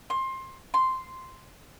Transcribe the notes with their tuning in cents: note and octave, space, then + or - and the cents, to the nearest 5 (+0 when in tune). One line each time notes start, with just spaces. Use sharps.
C6 +20
C6 -5